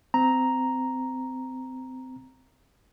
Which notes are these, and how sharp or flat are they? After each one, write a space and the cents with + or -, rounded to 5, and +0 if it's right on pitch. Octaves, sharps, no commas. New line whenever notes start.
C4 -25 A#5 +0